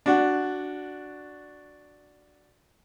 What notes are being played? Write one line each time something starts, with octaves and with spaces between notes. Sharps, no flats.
D4 F#4